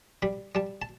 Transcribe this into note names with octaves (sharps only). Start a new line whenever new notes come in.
G3 B5
G3 A5
A5